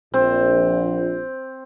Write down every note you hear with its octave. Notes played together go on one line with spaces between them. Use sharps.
A#1 C4